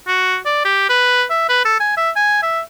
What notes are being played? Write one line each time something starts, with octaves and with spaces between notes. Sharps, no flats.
F#4
D5
G4
B4
E5
B4
A4
G#5
E5
G#5
E5